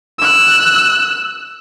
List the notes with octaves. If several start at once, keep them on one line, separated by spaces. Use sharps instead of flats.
E6 F#6